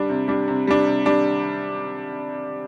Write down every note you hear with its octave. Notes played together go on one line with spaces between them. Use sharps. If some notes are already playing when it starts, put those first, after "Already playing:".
Already playing: G3 D4
C3
G3 D4
C3
G3 D4
C3
G3 D4